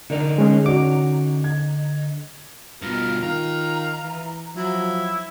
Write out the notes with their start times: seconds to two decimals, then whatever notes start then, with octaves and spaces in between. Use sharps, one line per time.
0.10 D3 D#4 A#4 D5
0.38 G#3 C#4 G#4
0.66 C#4 F#4 D5 D6
1.44 G#6
2.82 G2 B2 F4 A#4
3.23 D#3 F5 A#5
4.03 E3
4.56 F3 F#3 E4